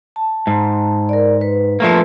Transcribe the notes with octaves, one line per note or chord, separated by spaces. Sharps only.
A5
G#2
A#4 D5
B4
F3 A3 A#3